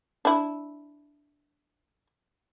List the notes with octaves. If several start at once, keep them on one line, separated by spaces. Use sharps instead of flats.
D4 E4